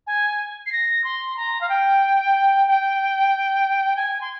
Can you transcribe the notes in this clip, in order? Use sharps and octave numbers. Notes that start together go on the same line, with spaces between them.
G#5
C7
A#6
C6
A#5
F5
G5
G5
G#5
C6